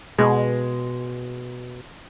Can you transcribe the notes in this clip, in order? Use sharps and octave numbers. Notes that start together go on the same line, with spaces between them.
B2 G#3